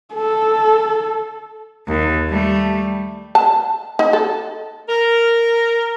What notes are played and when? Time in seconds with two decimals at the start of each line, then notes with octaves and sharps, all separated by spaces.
0.15 A4
1.87 D#2
2.29 G3 A3
3.35 A5
3.99 D#4
4.13 A4
4.89 A#4